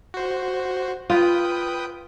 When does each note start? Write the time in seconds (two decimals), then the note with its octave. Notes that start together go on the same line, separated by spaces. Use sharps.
0.14 F#4 C5
1.10 F4 B4 G5 D#6